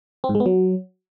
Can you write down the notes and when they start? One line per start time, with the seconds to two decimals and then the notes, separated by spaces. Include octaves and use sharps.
0.24 C4
0.29 G#2
0.35 G#3
0.40 B3
0.46 F#3